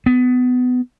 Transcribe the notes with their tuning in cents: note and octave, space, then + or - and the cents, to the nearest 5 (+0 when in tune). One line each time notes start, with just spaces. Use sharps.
B3 +20